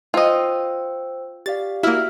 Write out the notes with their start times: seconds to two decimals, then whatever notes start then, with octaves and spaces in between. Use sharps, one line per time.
0.14 F4 C5 D#5 G5 E6
1.46 G4 D5 F5 A6
1.83 A#3 E4 F#4 E5 F6